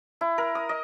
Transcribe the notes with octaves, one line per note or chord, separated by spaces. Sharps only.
E4
A#4
D#6
D#5